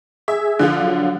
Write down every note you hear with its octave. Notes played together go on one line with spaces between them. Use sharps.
G#4 E5
D3 F3 F4
F#3